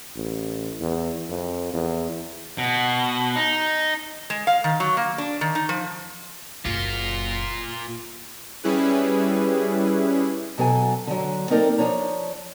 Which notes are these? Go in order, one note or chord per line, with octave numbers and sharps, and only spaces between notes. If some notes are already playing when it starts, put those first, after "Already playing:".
A1
E2
F2
E2
B2
D#4
G#3
F5
D#3
F#3
A#3
D4
D#3
D#4
F3
F#1 A#2 F4
G3 C#4 E4 G#4 B4
B2 F#3 A4 G#5
D3 F#3
A#3 C4 D#4 A4 A#4 D5
F3 D4 C#5 A#5